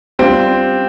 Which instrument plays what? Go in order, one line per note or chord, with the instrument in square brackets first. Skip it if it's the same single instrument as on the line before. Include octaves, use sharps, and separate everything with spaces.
[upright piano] G3 D4 F4 [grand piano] C4